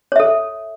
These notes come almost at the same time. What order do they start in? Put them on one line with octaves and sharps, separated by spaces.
C#5 E5 A4